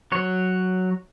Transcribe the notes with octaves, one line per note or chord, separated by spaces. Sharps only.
F#3 C#5